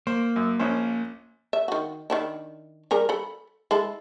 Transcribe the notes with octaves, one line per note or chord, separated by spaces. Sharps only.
A#3 C5
F#2
A#1 C#4 C5
E5
D#3 F#4
D#3 D4 E4
G3 G#4 A#4
A4 B5
G#3 E4 A4